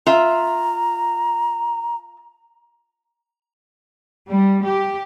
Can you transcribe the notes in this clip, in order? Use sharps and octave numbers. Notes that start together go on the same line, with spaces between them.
F4 E5 A#5
G3
G4